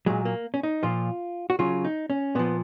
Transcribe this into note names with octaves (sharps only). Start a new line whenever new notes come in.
A#2 F#3 G#3
A#3
C#4
D#4
A#2 F3 F4
F#4
C#3 F#3 F4
D#4
C#4
A#2 F3 B3